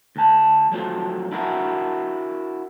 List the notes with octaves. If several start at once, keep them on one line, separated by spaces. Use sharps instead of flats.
D2 A5
F3 F#3 A3 F4
D4 E4 F#4 A#4